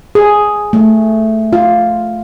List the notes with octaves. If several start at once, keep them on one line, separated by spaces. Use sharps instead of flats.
G#4
A3
F4